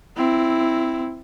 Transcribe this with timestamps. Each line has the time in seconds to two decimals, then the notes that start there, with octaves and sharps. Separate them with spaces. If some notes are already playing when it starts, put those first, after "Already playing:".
0.16 C4 E4